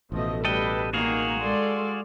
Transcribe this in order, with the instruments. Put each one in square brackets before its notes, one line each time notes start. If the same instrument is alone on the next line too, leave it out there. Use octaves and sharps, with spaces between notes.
[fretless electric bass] A1 B2 [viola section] F3 A3 D#5
[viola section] G3 B4 [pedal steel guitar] A4 D#5 G5
[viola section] D#3 [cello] A#3 D#4 [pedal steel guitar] F#4 G#4 F5
[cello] G#3 [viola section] A4 D5 C6